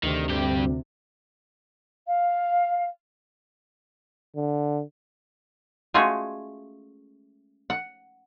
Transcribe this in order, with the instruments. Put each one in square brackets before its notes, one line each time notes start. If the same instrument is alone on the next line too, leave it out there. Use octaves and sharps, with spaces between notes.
[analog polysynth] D2 C3 [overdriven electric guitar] D#3
[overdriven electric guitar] G2 G4
[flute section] F5
[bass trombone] D3
[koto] G#3 A3 C#4 F4 F#4 G#4
F#5